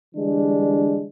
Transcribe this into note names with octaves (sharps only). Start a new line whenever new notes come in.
D3 E3 G3 G#3 D4